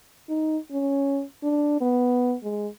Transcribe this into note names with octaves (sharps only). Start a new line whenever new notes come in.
D#4
C#4
D4
B3
G#3